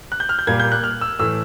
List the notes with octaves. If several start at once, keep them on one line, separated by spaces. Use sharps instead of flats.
F#6
G6
F6
G6
A#2 G3 A#3 G#6
G6
F#6
F6
E6
A2 E3 A3 E6